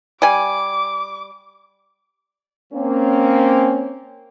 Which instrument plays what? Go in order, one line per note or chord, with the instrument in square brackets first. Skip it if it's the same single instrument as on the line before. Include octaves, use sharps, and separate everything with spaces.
[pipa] G3 G#5 [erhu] D6
[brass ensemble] A#3 C4 C#4